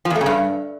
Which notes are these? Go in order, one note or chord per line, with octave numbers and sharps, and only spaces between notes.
F3
E2
A3
C#3
G2